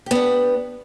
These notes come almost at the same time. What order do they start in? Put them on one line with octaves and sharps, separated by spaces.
G4 B3 D4